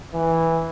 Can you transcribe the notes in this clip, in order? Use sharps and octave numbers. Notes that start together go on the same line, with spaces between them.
E3